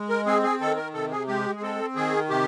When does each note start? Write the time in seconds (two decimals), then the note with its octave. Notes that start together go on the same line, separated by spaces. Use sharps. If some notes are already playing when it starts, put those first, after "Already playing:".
Already playing: G#3
0.09 A#4
0.26 C4 G#4
0.43 G#4
0.61 D#3 A4
0.77 A#4
0.94 C3 A4
1.11 G#4
1.28 G#3 G4
1.56 G#4
1.62 C4 A4
1.96 D#3 G#4
2.30 C3 G4